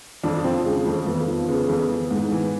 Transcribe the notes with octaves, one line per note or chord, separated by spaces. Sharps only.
F2 D4
F3 C4
C#3 G#3
F2 A3
F2 B3
F3
C#3 B3
F2
E3
G#2
E3